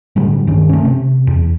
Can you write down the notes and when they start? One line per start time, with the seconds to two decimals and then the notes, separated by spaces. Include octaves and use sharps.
0.16 A2 D3 F#3 G3
0.47 C2 G2 D#3 C#4
0.69 A3 C#4
0.85 C3
1.27 E2